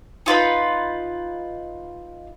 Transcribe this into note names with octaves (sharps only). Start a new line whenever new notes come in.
D#4 F4 B4 B5